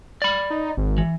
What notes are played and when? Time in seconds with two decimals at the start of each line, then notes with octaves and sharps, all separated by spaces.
0.22 D5 B5
0.50 D#4
0.77 G#1
0.98 E3